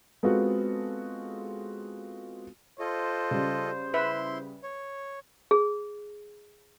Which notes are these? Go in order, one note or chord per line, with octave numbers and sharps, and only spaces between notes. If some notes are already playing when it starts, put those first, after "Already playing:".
G#3 B3 C4 F4 F#4 A4
F4 A4 C5 D#5
C#3 G3
E4 B4 E5 C6
C#5
G#4